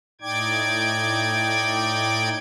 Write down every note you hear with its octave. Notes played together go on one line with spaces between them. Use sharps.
A2 D#4 D5 G5 D6 G#6